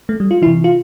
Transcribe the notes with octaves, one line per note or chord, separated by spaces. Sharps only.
A3
G3
F4
C3 E3 E4
F4